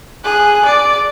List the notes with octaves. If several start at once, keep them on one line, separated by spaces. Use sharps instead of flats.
G#4 F#6
D5